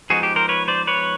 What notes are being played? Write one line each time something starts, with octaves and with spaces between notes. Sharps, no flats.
F3 G#3 B3 D#4 F#4 G#4
G4
A#4 C5
B4 C#5
C5 D5
B4 C#5